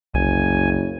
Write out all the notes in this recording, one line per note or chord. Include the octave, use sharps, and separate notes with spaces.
F#1 C2 G#5